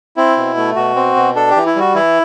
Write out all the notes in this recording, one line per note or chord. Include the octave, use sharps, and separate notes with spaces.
C4 E4
B2
A3
B2 F#4
C4
B2
D4 A4
G4
E3
E4
G3 F#4
E3 E4